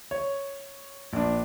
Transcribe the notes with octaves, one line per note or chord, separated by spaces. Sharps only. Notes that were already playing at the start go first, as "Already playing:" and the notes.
C#5
A#1 D4